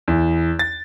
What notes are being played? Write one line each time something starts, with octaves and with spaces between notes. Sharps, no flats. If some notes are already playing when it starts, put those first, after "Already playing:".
E2
A6